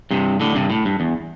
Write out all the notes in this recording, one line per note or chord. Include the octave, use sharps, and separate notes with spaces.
G2 C3
A2 D3
G2 C3
A2
G2
E2